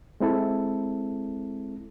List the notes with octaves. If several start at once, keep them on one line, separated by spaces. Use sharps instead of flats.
G#3 C4 E4 A4